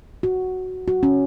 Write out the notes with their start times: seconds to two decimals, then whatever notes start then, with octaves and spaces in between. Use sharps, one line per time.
0.23 F#4
0.88 F#4
1.03 C#4